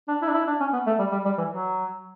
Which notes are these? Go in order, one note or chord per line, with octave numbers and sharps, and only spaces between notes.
D4
E4
D4
E4
D4
C#4
B3
A3
G3
G3
G3
E3
F#3